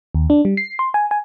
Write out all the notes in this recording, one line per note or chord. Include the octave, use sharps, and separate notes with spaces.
D#2
D4
G3
C7
C6
G#5
G#5